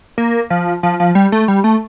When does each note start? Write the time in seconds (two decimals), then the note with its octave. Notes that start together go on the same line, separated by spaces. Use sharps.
0.18 A#3
0.50 F3
0.83 F3
1.00 F3
1.15 G3
1.32 A3
1.48 G3
1.64 A3